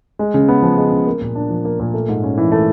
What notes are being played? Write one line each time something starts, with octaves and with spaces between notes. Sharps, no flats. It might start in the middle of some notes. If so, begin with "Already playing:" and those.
G#3
C#3
B3
F3
G#3
C#3
A#3
A#2
D4
F3
A#3
A#2
A3
G#2
C#4
E3
A3